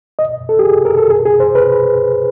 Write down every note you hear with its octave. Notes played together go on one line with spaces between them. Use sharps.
D#5
A4
G4
G#4
A#4
A4
G#4
G#4
C5
B4